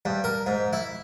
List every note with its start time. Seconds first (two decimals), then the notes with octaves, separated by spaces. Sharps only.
0.05 G2
0.24 A#4
0.46 G#2
0.73 E4